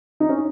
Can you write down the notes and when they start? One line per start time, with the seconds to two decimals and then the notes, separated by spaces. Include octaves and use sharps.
0.20 D#4
0.29 C#4